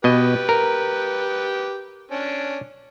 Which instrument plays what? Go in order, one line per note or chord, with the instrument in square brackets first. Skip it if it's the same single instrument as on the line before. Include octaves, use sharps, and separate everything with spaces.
[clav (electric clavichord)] B2 D#5 [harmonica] G4 B4
[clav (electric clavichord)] A#4
[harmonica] C#4 D4